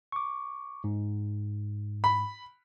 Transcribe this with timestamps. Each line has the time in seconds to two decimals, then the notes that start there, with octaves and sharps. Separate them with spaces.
0.12 C#6 D6
0.84 G#2
2.04 B5